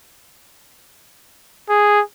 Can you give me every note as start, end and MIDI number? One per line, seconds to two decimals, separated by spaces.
1.69 2.01 68